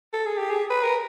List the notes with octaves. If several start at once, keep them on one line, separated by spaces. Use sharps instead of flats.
A4
G#4
G4
G#4
B4
A#4